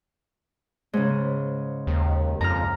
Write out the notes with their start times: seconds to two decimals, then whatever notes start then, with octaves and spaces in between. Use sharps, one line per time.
0.93 G#2 C#3
1.87 D#2
2.41 F2 A#5 F6